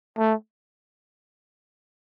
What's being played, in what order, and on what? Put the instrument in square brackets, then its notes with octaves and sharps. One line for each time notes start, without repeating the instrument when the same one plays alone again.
[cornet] A3